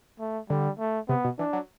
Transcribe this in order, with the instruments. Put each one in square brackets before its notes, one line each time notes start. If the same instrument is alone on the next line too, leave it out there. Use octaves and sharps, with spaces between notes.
[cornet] A3
[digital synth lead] D3 [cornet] G3
[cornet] A3
[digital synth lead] C3 [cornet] B3
[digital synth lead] B2
[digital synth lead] E3 [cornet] D4
[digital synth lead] F#3